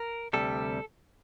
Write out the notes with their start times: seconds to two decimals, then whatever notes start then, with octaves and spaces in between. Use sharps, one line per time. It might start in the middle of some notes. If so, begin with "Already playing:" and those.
Already playing: A#4
0.33 D2 C3 G3 A4